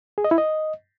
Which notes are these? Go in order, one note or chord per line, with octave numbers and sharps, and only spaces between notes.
G#4
D#5
E4
D#5